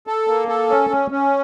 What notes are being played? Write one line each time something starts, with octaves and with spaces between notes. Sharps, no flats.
A4
A#3
A4
C#4
C#4
C#4